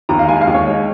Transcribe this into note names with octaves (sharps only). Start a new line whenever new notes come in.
D#2 A#5
F5
G#3 G#5
F5
D#2
C#5
G#3